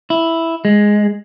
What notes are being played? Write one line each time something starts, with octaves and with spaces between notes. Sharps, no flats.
E4
G#3